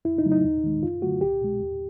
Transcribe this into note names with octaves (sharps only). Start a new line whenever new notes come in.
F2 E4
D#4
C#3 F#3 A3
D#4
D#2
D#3 G#3
F#2 F4
D3 F#3 A3 F#4
C2 G4
B2 G#3
D#2